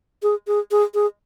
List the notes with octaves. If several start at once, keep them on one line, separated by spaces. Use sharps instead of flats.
G#4
G#4
G#4
G#4